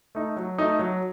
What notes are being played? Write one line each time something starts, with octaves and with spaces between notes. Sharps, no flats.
A3 D#4
F#3
A3 D#4
F#3